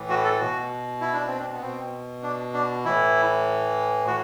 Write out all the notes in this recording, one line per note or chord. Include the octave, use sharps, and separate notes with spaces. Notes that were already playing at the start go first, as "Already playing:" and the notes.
Already playing: A2 E3
F#4
A4
B2 F#4
E4
D4
C4
D4
B3
B2 C4
D4
D4
A2 E3 E4
A2 F#4